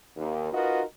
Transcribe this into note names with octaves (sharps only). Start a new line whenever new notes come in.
D#2
D#4 F4 F#4 A#4 B4 D#5